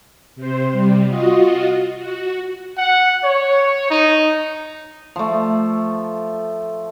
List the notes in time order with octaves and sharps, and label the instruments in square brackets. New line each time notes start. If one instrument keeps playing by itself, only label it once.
[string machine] C3 C5
C3 G3
F4 F#4 D#5
F#4
[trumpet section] F#5
C#5
D#4
[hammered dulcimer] F3 A3